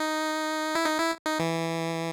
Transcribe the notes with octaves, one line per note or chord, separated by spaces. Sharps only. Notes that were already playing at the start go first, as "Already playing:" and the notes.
Already playing: D#4
E4
D#4
E4
D#4
E3